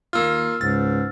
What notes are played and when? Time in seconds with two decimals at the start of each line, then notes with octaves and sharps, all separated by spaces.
0.13 D#2 A#3 F4 E6 F6
0.61 C#2 G#2 A6